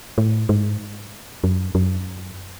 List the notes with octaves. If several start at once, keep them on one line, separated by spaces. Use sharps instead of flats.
A2
G#2
F#2
F#2